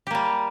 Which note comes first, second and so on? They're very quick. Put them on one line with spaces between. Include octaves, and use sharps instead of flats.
G4 A#3 G3